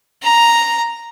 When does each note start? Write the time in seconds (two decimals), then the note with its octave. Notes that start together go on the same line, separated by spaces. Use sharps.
0.23 A#5